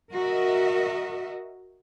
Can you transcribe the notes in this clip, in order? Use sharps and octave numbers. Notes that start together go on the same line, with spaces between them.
F#4 A#4 D#5 E5